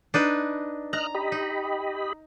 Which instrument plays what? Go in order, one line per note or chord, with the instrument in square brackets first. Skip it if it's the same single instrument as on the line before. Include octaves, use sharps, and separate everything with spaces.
[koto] D4 D#4 B4
[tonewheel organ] D#5 F6 F#6 [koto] A#5
[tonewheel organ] G4 D#5 B5
[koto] D#4